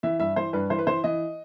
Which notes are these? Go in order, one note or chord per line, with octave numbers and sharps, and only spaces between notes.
E3 E5
G2 E5
E3 C5
G2 B4
E3 C5
B4
E3 C5
E3 D#5